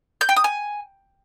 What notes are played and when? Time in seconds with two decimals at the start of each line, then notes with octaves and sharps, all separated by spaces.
0.21 G6
0.29 G5
0.36 D#6
0.44 G#5